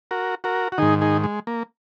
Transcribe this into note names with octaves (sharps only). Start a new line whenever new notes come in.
F#4 A#4
F#4 A#4
F#4
G#2 D#3 D#4 G#4
D#4 G#4
G#3
A#3